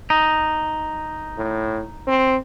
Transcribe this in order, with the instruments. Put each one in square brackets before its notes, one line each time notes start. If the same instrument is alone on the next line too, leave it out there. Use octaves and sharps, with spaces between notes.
[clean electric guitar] D#4
[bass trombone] A2
C4